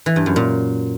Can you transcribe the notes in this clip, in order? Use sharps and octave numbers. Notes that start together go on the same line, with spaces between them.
E3
G2
F#2
A#2